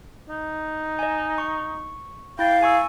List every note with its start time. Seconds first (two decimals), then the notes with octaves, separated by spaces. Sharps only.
0.29 D#4
0.99 D#5 G#5
1.38 C#6
2.39 E4 F5 G5 A6
2.62 G#4 G#5 C#6 E6